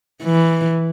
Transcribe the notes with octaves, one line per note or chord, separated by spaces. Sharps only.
E3